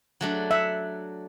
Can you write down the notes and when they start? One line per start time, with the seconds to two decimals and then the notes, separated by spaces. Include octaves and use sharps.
0.21 F#3 A3 D4
0.51 E5 F#5